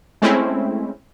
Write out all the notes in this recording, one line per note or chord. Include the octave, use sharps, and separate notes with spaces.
G#3 A3 C4 C#4 E4